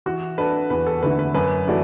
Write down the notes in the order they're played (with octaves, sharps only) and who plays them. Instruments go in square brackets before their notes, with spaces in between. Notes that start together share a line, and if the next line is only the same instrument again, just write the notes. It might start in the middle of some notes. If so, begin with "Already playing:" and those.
[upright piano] E3 [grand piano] F#4
[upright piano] D4 A4 D5 [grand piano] B4
[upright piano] E2 [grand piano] B4
[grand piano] A4
[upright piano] D3 A3 E4 [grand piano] B4
[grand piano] B4
[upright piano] F#2 [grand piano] B4
[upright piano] E3 A3 F#4 D5